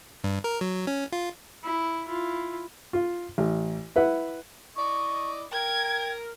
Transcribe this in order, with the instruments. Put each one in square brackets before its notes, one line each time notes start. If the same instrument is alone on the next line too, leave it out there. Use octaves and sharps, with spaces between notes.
[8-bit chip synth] G2
A#4
F#3
C#4
F4
[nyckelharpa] E4
E4 F4
[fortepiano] F4
A1
E4 B4 E5 F#5
[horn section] E4 D5 D#5 [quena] C#6
[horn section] A#4 [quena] G5 [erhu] G#6